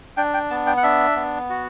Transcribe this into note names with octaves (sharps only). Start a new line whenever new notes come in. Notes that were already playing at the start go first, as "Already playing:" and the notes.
D4 G5
G5
B3 A5
G5
F#5
D4 E5
B3
F#4